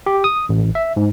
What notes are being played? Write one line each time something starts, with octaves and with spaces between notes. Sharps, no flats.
G4
D#6
A1
E5
G#2